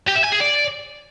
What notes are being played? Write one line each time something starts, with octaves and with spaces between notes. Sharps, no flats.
G4
E5
G#5
G#4
D5